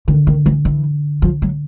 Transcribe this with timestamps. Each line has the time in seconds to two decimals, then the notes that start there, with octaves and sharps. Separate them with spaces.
0.08 D3 D#3
0.27 D#3
0.46 E3
0.65 E3
1.22 F3
1.42 F#3